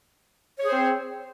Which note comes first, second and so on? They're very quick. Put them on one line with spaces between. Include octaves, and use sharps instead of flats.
C#5 G#4 C5 C4